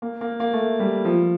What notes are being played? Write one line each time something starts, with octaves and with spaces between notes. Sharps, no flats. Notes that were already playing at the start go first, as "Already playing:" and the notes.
A#3
A#3
A#3
A3
G3
F3